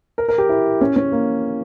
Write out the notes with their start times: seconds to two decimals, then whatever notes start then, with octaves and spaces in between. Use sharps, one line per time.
0.18 A#4
0.28 A#4
0.38 G4
0.49 E4
0.81 C#4
0.96 C#4
1.12 A#3